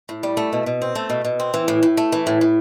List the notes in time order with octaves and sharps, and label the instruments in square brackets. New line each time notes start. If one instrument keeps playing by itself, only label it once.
[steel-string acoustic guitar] A2
G3
A3
B2
B2
C4
A3
B2
B2
C4
E3
A2
A2
A3
E3
A2
A2